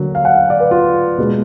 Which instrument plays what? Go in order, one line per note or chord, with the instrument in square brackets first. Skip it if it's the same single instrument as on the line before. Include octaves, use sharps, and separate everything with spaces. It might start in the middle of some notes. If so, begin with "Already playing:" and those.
Already playing: [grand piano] D3 F#3 A#3
F5
F#5
F5
D5
B4
F4
B2 G#3 B3